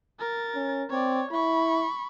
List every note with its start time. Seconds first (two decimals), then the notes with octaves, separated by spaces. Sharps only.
0.20 A#4 A6
0.55 C#4
0.90 C4 C#5 D5
1.32 E4 B5 C#6